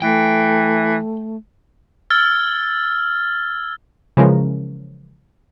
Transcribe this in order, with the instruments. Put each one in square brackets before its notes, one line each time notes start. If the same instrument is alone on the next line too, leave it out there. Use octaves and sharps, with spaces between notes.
[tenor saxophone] E3 [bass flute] A3 [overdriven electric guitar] G5
[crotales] E6 F6 G#6 A6 G7
[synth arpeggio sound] C#3 E3 F3 G#3 C#4 A#4